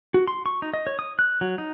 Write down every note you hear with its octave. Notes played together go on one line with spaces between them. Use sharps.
F#4
C6
C#6
D#4
D#5
C#5
D#6
F#6
F#3
D#4